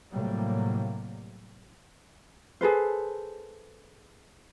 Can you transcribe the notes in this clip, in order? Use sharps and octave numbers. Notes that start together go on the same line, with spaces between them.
A2 C3 F#3 G3 A#3
G#4 A4 B4 C5